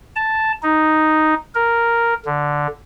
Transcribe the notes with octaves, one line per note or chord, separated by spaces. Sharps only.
A5
D#4
A#4
D3